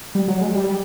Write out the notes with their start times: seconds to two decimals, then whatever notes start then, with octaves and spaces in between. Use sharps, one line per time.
0.15 G3
0.28 F#3
0.41 G#3
0.54 G3